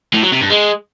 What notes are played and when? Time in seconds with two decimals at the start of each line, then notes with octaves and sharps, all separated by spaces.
0.14 A2
0.23 F#3
0.32 C3
0.41 G2
0.50 G#3